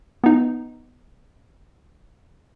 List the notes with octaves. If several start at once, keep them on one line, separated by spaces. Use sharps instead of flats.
B3 D#4